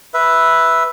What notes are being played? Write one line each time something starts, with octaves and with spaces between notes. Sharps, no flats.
B4 E5